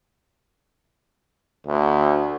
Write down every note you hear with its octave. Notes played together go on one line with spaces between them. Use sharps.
D2